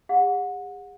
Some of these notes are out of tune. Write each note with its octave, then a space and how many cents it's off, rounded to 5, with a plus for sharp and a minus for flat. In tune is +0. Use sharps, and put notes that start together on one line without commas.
G#4 -45 F#5 -25